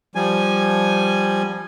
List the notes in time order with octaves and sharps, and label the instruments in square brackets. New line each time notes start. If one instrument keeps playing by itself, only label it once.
[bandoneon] F3 G3 G#5